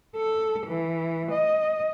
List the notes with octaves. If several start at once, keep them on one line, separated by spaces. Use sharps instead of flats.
A4
E3
D#5